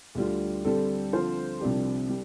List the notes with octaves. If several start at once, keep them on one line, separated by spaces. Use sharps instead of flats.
D2 D3 G3 F4
D3 G3 C4 A4
D3 F3 C4 F4 C5
C2 C3 F3 D4 G4
G3